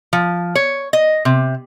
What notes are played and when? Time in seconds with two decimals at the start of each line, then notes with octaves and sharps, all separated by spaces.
0.13 F3
0.55 C#5
0.93 D#5
1.25 C3